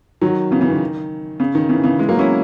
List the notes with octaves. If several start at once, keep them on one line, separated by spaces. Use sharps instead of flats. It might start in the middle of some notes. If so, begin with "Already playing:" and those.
D#3 F#3
C#3 E3
C#3 E3
D#3
C#3
D#3
C#3 E3
C#3 E3
E3 G#3
F#3 A#3
C#4 E4